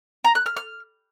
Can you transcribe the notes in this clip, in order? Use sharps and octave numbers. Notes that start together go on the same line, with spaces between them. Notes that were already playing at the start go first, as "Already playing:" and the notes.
A#5
F#6
F6
F6